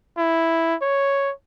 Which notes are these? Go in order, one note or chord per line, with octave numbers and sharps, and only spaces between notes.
E4
C#5